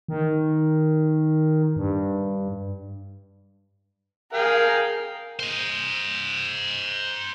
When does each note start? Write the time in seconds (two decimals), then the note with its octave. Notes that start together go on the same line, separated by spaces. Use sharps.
0.08 D#3
1.76 G2
4.33 G#4 A#4 F5 G5
5.40 C5 D#5